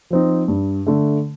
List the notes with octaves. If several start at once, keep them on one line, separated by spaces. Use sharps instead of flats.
F3 C4 D#4
G2
D3 A3